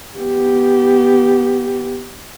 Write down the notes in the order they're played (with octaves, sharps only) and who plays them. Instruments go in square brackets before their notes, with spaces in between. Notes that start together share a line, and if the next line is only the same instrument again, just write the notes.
[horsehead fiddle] B3 G4